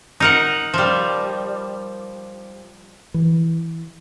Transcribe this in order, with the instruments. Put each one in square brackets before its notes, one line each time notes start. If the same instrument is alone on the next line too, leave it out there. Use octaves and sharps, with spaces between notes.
[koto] D#4 A#4 F#5
F3 G3
[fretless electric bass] E3